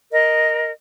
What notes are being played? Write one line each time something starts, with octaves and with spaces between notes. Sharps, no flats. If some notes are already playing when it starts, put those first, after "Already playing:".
A#4 D#5